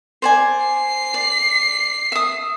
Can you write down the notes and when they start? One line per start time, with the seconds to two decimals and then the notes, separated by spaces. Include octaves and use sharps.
0.22 C5 D5 G#5
0.65 C7
1.14 D5
2.12 E5 D#6